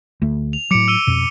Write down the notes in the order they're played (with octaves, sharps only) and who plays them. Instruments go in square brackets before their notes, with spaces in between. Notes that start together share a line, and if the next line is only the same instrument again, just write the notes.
[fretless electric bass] D2 A3
[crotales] F7
[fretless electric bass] A2 F#3 [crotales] D6 C#7 D7
[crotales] E6 D#7 G7
[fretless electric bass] F2 B2